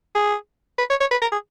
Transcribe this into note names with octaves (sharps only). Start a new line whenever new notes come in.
G#4
B4
C#5
C#5
B4
A#4
G#4